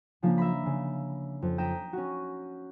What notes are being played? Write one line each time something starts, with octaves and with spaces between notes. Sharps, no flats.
C#3 F3 A#3 D4
E5 A#5 B5
C#3
F2
G5 A#5 D#6 B6 D7 E7
C#4 F#4